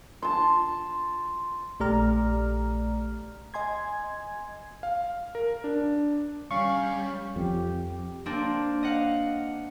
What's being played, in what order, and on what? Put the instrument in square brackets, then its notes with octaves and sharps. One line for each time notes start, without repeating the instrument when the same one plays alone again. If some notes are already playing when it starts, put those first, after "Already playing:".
[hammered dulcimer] A5 C6
[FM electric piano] A#1 A3 G4 D5 A#5 F6
D#5 G#5 C6 G#6
[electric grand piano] F5
A#4
D4
[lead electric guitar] G3 [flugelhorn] C#4 [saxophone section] F5 [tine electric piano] C#6
[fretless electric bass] F2 [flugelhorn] G4
[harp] A#3 C4 D4
D#5 F5 F#5